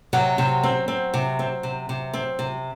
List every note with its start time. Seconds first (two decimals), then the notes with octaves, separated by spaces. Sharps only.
0.13 C3 F#3 F#4
0.38 C3
0.64 C4
0.88 C4
1.14 C3
1.39 C4
1.63 C3
1.89 C3
2.14 C4
2.39 C3